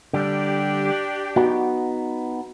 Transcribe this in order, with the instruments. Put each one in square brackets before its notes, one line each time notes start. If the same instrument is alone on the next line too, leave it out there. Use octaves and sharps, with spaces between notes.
[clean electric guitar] D3 G3 [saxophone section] D4 G4
[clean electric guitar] B3 D#4 [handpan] F#4